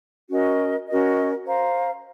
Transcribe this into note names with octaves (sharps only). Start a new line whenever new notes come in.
C#4 F#4 A#4 D#5
C#4 F#4 A#4 D#5
C5 F5 A#5